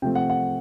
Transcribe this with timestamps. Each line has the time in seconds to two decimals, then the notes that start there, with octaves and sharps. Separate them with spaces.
0.02 C3 F3 A3 C4 G5
0.15 F#5
0.30 F#5